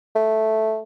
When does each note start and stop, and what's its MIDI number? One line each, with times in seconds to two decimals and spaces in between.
0.16 0.81 57